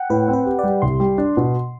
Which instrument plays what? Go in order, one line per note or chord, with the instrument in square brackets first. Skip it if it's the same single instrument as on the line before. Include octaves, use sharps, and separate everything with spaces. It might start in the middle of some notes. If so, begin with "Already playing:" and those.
Already playing: [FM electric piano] F#5 G5
[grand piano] A2 [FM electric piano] B4
[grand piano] C4
[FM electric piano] B4
[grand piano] G4
[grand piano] G3 [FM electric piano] D5
[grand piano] C2 [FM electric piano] C6
[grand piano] G3
D4
B2